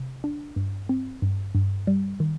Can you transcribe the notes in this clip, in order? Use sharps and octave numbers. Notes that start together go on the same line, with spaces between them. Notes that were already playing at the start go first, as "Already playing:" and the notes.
Already playing: C3
D4
G2
C4
G2
G2
G3
D#3